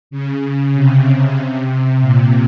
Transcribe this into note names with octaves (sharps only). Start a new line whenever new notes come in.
C#3
C3
C3
C3
A#2